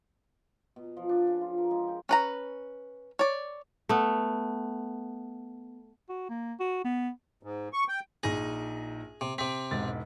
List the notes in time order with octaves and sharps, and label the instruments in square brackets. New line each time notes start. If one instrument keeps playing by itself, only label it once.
[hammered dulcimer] B2
F3
D4
C#3
F4
A#4
G#3
G5
[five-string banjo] C#4 B4 A#5
C#5 D5
[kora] A3 B3
[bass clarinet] F#4
A#3
F#4
B3
[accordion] G#2
C#6
G5
[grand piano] A#1 D#4 A#6 [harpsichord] G#4
[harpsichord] C3
[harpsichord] C3 C4 [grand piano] B6
[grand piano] E1 G#2 A6